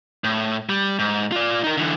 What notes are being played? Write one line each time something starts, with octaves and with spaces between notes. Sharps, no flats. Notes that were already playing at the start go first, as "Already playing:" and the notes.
A2
G3
G#2
F4 D5
D#4 A#4
D3 E3